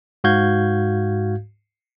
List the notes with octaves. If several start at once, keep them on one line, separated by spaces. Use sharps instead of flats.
G#2 F#4 F5 G6 G#6